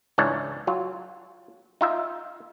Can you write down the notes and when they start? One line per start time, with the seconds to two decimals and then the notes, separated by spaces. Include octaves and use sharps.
0.18 C#2 G#2 E3 D4 C#5
0.67 F#3 F4
1.81 D#4 F4 E5